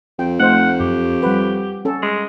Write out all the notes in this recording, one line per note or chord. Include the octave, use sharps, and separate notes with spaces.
F2 G5
A3 D#4 C5 F#5
F#2 G4
G3 B4 F#5
C#4 A4
G#3